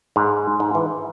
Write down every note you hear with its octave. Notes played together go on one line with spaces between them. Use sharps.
G#2
G#2
E3